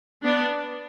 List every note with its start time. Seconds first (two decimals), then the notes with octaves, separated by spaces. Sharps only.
0.24 B3 D4